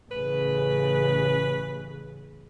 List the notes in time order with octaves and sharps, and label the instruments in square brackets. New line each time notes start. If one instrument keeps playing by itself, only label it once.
[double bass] A1 C#3 [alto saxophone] B4